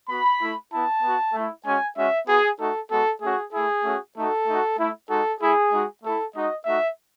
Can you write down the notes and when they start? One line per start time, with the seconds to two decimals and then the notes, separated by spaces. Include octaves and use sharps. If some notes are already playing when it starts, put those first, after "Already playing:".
0.08 B3 F#4 B5
0.40 A3 E4
0.71 B3 E4 A5
1.03 B3 F#4
1.33 A3 E4
1.65 G#3 C#4 F#4 G#5
1.96 G#3 C#4 F#4 E5
2.27 B3 F#4 G#4
2.59 A3 D#4 F#4 A4
2.90 G#3 B3 F#4 A4
3.21 A3 C#4 F#4 G#4
3.52 A3 E4 G#4
3.84 A3 C#4 F#4
4.16 A3 D#4 F#4 A4
4.47 A3 D#4 F#4
4.77 A3 E4
5.09 G#3 D#4 F#4 A4
5.40 A3 E4 G#4
5.72 G#3 D#4 F#4
6.02 A3 E4 A4
6.34 G#3 D#4 F#4 D#5
6.65 A3 D#4 F#4 E5